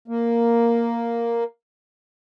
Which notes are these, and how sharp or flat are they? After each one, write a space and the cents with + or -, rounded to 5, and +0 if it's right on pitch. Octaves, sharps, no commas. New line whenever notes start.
A#3 +0